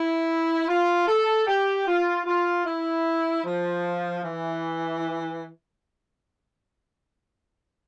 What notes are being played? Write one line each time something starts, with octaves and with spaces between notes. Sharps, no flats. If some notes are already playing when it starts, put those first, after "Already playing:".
Already playing: E4
F4
A4
G4
F4
F4
E4
F3
E3